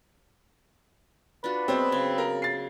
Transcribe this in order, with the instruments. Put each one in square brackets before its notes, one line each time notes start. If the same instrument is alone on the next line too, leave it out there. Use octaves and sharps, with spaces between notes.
[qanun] D4 F4 F#4 [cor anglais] B4
[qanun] F#3 G#3 B3 [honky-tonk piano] C4
[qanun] C#3
[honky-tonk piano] A#4
A6 C7